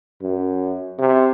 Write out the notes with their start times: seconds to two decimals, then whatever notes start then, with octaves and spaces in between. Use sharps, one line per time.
0.22 F#2
0.99 C3